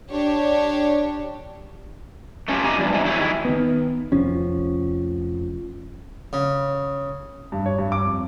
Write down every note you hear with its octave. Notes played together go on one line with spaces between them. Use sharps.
D4 G4 C#5
A3 C#4 E4 F4 G4
B2 D#4 G4 G#5 A#5
E2 G2
G#2 D3 E3
E3 F#3 E4 G4 G#4
D#3 E4
D#3 B3
F1 F3 C#4
C#3
G2
C#5
G2
D6
F2